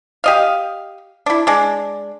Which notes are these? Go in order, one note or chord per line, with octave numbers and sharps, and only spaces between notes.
G4 D#5 F5
D4 E4
G#3 D4